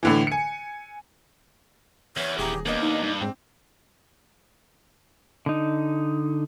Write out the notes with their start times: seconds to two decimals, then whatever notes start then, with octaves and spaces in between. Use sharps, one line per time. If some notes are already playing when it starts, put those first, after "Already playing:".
0.03 A2 D3 E3
0.27 G#5 C#7
2.17 E2 C#5
2.39 D#1 G4 G#4 A#5
2.66 D#2 A#3 B3 D4 D#5
2.82 D#4
3.03 G2
3.21 G#2 C4 G5
5.46 D3 D#4